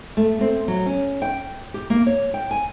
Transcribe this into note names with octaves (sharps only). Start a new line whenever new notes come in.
A3
C4
F#3
C#4
G5
G4
A#3
C#5
G5
G#5